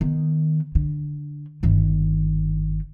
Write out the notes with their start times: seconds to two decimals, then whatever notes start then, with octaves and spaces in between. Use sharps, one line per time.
0.01 D#3 B3
0.75 D3
1.63 G1 D#3